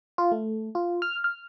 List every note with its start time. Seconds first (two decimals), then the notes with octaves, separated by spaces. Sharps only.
0.18 F4
0.32 A3
0.75 F4
1.02 F6
1.24 F6